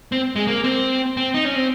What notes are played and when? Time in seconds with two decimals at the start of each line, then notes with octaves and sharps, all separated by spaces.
0.12 C4
0.36 G#3
0.47 A#3
0.64 C4
1.17 C4
1.34 D#4
1.45 C#4
1.56 C4